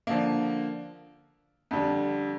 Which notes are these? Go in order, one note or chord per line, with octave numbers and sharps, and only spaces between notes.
D3 F3 A#3
F2 D3 G3